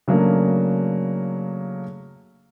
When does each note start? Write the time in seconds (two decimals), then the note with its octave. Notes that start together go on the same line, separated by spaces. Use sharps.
0.08 C#3 F#3 A3 A#3 D4